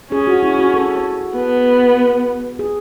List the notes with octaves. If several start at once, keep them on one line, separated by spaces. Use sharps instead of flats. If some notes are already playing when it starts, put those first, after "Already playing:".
C#4 G#4
F#4
E4
F#4
A4
B3
G#4